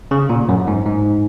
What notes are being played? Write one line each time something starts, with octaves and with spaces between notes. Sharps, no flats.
C#3
A#2
F#2
G#2
G#2